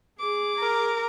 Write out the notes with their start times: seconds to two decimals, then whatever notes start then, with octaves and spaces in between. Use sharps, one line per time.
0.19 G#4 D6
0.60 A#4